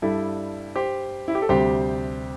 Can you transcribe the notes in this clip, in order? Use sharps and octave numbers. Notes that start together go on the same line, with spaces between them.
G2 G3 E4 A4
G4 C5
E4
G4
A4
D2 C3 G3 G4 C5